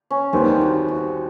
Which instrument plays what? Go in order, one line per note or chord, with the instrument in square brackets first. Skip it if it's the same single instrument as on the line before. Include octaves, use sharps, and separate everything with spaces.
[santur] C#4
[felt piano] D#2 D#3 G3 B3 D#4 [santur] C4
[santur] F#4
F#4